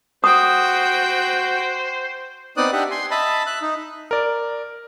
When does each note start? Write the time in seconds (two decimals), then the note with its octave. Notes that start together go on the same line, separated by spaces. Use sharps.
0.24 F#4 C5 G5 D#6
2.57 B3 C4 D#4 D5 D#6 F#6
2.73 D4 G4 D#5 E5 F#5
2.91 G#5 C6
3.11 D#5 E5 A5 B5
3.46 E5 F#6
3.62 D#4
4.11 A#4 D5